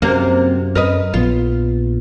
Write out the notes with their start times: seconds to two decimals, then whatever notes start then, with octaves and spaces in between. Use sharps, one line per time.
0.02 F#2 C3 A#3
0.75 F#2 A#4 B4 D#5
1.14 A#1 B3 F4